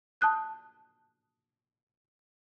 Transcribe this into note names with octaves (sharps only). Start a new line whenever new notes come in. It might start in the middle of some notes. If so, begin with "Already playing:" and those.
A5 D#6 F#6 G6